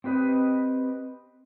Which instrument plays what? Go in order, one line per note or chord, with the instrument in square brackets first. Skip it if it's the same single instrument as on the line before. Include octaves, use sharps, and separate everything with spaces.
[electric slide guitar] C4 G4 B4 D#5